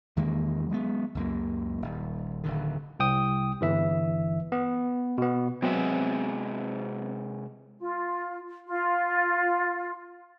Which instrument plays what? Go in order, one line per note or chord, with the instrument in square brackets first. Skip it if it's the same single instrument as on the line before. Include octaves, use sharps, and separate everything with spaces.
[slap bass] E2 D#3 G#3 A#3
F#3 G#3 A#3 B3
C#2 F#2 A#3
D#1
D1 D3 D#3
[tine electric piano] C2 G5 D#6
G1 E3 E5
B3
B2 B3
[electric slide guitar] C3 G#3 E5 [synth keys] F#3 B3 C4
[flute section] F4
F4